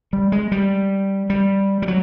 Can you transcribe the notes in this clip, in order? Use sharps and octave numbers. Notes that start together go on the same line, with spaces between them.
G3
G#3
G3
G3
G3
F#3